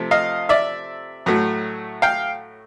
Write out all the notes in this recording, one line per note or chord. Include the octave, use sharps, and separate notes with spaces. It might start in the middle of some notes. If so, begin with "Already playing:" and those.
Already playing: C3 F3 A3
D#5 F5
D5 E5
A2 F#3 A3
F5 G5